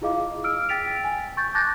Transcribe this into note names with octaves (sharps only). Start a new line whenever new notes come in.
E4 F4 G#4 D#5 F5 D6
E6 F6 D7
G5 A6 B6 D7 F7
G#5
C#6 G6 A6
A5 D6 F#6 G6 A6 A#6